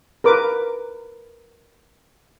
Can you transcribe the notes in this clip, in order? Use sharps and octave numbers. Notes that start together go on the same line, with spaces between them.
A#4 B4 D6